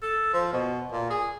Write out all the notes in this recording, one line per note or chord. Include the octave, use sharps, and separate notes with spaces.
A4
F3
B2
A#2
G#4